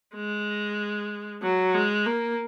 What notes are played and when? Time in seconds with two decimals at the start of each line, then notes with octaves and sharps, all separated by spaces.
0.15 G#3
1.42 F#3
1.74 G#3
2.06 A#3